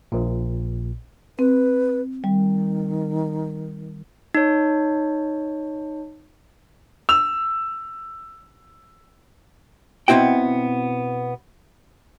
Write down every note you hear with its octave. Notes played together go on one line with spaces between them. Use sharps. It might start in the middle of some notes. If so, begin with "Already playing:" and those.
A#1 A#2
C4 B4
D#3 G3
D#4 C#5
E6 F7
B2 B3 C4 E4 F#4 G5